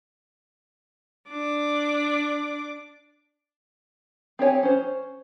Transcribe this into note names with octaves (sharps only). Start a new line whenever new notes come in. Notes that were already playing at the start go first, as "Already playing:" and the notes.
D4 D6
C4 G4 C#5 G#5
C#4 C5